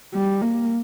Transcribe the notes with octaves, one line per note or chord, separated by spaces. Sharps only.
G3
A#3